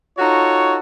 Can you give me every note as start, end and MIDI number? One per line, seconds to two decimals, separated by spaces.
0.18 0.78 63
0.18 0.78 65
0.18 0.78 66
0.18 0.78 69
0.18 0.78 73